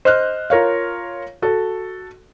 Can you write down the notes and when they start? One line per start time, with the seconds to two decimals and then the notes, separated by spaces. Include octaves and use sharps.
0.05 C5 D#5 F6 F#6
0.50 F4 A#4 C#5 F5
1.42 F#4 A4